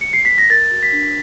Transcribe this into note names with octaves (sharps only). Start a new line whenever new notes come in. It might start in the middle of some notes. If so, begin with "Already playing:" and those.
C#7
C7
B6
A#6
A#4 A6
F#4
B6
D4